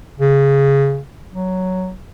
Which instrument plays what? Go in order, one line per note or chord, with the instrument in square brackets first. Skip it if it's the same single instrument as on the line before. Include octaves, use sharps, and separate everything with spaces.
[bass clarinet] C#3
F#3